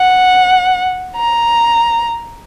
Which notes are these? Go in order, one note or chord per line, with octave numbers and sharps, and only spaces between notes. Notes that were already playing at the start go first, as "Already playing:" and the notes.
Already playing: F#5
A#5